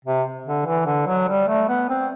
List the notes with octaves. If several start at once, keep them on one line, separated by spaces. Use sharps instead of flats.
C3
D3
E3
D3
F#3
G3
A3
B3
C4